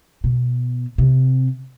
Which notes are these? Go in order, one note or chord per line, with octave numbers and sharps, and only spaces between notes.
B2
C3